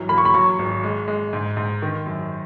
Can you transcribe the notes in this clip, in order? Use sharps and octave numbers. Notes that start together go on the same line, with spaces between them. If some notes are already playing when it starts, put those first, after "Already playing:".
Already playing: G#1 E3 F#3
A#3 B5
C#6
B5
F#3 C#6
G#1
G#3
G#3
G#2
G#2
D#3
F#2